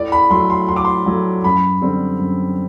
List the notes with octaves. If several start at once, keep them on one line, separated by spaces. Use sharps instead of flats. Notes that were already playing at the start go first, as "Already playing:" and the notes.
Already playing: A2 D5
B5
F#3 A3 C6
C6
A2 C6
D6
C6
F#3 A3
F#2 B5
D3 G3 C4
F#2